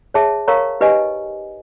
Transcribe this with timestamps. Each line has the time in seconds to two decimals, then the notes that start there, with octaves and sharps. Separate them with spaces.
0.14 G#4 C#5 E5 A5
0.48 A#4 C#5 F5 A#5 C#6
0.81 D#4 G4 B4 D#5 G#5